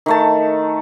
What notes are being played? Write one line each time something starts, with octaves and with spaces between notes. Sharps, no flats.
D#3 A3 A5